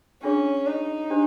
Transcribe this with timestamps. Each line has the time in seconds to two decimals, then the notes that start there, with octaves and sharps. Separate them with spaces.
0.23 C#4 D4 F4 G#4 C#5
0.67 D#4
1.10 D4 G4 C5